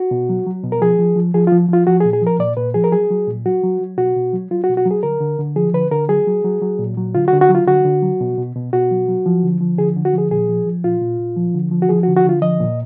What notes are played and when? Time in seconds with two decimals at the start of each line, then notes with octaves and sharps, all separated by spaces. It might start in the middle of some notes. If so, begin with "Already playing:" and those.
Already playing: F#4
0.11 B2
0.29 F#3
0.46 F#3
0.64 B2
0.72 A#4
0.81 F3 G#4
0.99 F3
1.16 F3
1.34 F3 G#4
1.47 F4
1.52 F3
1.69 F3 F4
1.87 F3 F#4
2.00 G#4
2.05 A#2
2.13 G#4
2.22 F3 A#4
2.39 A#2 D5
2.57 A#2 B4
2.74 F3 G#4
2.84 A#4
2.92 F#3 G#4
3.11 F#3
3.27 A#2
3.45 F#3 F#4
3.63 F#3
3.81 F#3
3.98 B2 F#4
4.16 B2
4.33 F#3
4.51 F#3 F4
4.64 F#4
4.69 B2
4.77 F#4
4.86 F#3
4.91 G#4
5.03 D3 A#4
5.21 D3
5.39 D3
5.56 F3 G#4
5.74 D3 B4
5.91 D3 A#4
6.09 F#3 G#4
6.27 F#3
6.45 F#3
6.62 F#3
6.79 A#2
6.97 F#3
7.15 D3 F4
7.28 F#4
7.33 D3
7.41 F#4
7.49 F#3
7.55 F4
7.67 D3 F#4
7.85 D3
8.02 F#3
8.21 B2
8.38 B2
8.55 B2
8.73 B2 F#4
8.91 F#3
9.08 F#3
9.26 F3
9.43 D3
9.61 F3
9.78 D3 G#4
9.96 D3
10.05 F#4
10.13 F3 G#4
10.31 A#2 G#4
10.49 F3
10.66 F3
10.84 A#2 F4
11.01 A#2
11.20 A#2
11.36 F3
11.54 D3
11.71 F3
11.82 F#4
11.89 F3 G#4
12.03 D3 F#4
12.16 F#4
12.25 D3 F4
12.42 F3 D#5
12.60 A#2